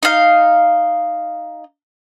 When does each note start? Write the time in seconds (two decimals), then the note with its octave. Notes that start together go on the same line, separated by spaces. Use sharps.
0.03 D#4 F5